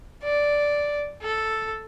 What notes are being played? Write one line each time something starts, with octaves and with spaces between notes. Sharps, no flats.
D5
A4